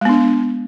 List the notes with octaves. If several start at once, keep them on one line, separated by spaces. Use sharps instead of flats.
G#3 B3 D4